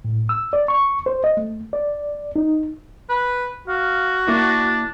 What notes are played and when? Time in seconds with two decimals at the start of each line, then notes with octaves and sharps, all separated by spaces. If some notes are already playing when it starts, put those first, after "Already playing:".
0.05 A2
0.29 E6
0.53 D5
0.68 C#6
1.06 C5
1.24 D#5
1.37 A3
1.73 D5
2.36 D#4
3.09 B4
3.68 F#4 F5
4.28 A#3 D4 E4